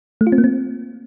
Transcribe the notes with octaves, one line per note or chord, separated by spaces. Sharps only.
A3
F4
C4
A#3
C4